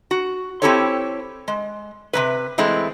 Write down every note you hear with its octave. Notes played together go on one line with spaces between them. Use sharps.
F#4
C4 E4 G4 A4 C5 C#5
G#3
C3 G3 B4
E3 G#3 A3 C4